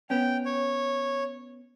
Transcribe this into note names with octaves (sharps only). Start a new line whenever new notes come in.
B3 C#4 G5
C#5